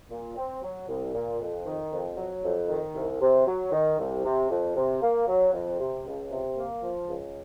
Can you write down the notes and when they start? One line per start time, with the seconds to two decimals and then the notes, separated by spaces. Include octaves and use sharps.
0.10 A#2
0.37 C4
0.63 F#3
0.88 C2
1.14 A#2
1.40 F2
1.66 D#3
1.91 F2
2.17 F#3
2.43 F2
2.69 D#3
2.95 C2
3.21 C3
3.47 F#3
3.72 D#3
3.99 C2
4.24 C3
4.50 F2
4.76 C3
5.02 A#3
5.27 F#3
5.53 F2
5.79 C3
6.05 C#2
6.31 C3
6.57 A#3
6.83 F3
7.08 C#2